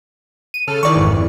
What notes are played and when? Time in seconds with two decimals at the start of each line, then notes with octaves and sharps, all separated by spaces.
0.54 D#7
0.67 C#3 A4 F6
0.83 D#3 E3 D5 C#6
0.96 G#1 F2 E3